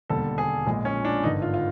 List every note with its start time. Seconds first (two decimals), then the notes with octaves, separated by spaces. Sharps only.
0.10 E1 D#2 D3 G3 A4
0.38 G#4
0.66 A#1 A#2 F3 G#3
0.85 C#4
1.05 D4
1.23 G#1 G2 D3 D#4
1.42 F4
1.54 F4